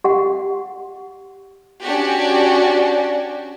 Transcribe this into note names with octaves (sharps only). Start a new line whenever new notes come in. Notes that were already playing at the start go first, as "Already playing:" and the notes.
G4 F#5
C#4 D4 F#4 G4